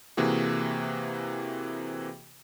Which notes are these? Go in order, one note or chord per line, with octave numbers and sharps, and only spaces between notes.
C3 E3 A#3 F#4 G#4